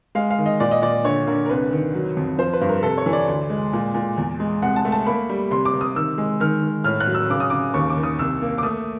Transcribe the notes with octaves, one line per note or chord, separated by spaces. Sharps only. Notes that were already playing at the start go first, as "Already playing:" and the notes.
G#3 F5
F5
D#3
D#5
A#2 D5
D#5
A#2 D5
D3 C#5
D3 A#4
A#4
C2 B4
D#3
F#3
F2
F3 C5
B4
G2
A#4
C3 A4
C#5
E3
D5
D2
G#3
A#2
A#2
E2
G#3
C2 F#5
A5
A3
A5
A#3 B5
G3
C3 C6
D6
C3
D#6
D#3 E6
G#3
D#3 F6
D#3
A2 F6
F#6
F#3
E6
C#3 D6
D#6
C#3 D6
D#2 C#6
D6
D#3
D#6
C2 E6
A#3
D6
A3 D#6